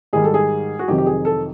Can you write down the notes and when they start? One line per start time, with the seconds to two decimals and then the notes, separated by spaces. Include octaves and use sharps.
0.13 G#2 D#3 G3 G#4
0.24 A4
0.34 G#4
0.79 F#4
0.88 F2 C3 D#3 F#3 G4
0.98 G4
1.06 G#4
1.25 A4